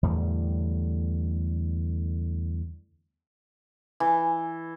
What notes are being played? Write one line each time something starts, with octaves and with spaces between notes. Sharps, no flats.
E2 A2 D3 G3
E3